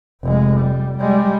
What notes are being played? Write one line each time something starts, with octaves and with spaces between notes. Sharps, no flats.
F1 G#3
G3
G3 G#3